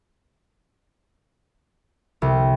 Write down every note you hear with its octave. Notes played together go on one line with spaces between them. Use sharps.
C2